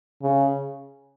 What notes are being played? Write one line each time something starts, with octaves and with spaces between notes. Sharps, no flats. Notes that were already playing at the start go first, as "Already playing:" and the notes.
C#3